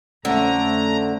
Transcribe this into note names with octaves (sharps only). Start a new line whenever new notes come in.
F2 D3 A3 C#4 C5 D5 A#5